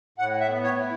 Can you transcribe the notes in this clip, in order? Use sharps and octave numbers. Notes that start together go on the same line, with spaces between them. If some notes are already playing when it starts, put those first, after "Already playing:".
A2 F#5
E5
B3
C#5
E4